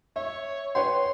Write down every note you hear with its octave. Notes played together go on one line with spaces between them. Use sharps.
C#5 E5
B4 C#5 G5 C6